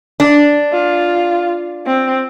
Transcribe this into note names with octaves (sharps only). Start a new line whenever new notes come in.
D4
F4
C4